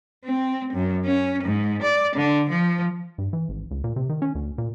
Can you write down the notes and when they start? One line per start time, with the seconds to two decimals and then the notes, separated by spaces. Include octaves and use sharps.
0.25 C4
0.73 F#2
1.05 C#4
1.44 G#2
1.82 D5
2.16 D3
2.49 F3
3.18 G2
3.33 E3
3.49 G#1
3.71 C#2
3.84 A#2
3.96 C3
4.09 D#3
4.22 C#4
4.35 D2
4.58 A#2